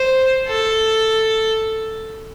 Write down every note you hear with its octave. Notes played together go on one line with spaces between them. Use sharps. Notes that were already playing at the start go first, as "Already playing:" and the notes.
Already playing: C5
A4